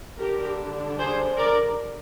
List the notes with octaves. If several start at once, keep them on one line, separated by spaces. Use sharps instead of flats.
D3 G3 D4 G4 A#4
G#4 C5
A#4 D5